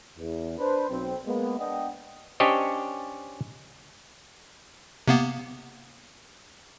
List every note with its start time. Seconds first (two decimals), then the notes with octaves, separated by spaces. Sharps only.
0.18 E2
0.58 D4 B4 C5
0.89 B1 C4
1.26 G#3 A#3 B3
1.59 B3 D4 D5 D#5 F#5 G5
2.40 C#4 D4 G4 C5 C#5 D#5
5.08 C3 A#3 B3